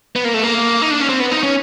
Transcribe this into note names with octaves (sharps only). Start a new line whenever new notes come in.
B3
A#3
A3
A#3
D#4
D4
C#4
C4
B3
D#4
C#4